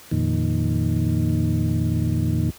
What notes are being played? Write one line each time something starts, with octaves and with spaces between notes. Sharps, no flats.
F2 A#2 D#3